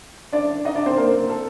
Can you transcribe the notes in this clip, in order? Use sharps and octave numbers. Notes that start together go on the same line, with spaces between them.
D4 D5
D#4 D#5
D4 D5
C4 C5
A#3 A#4
A4